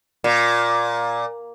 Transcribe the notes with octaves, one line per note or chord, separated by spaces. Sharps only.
A#2